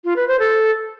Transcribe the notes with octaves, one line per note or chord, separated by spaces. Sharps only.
F4
B4
C5
A4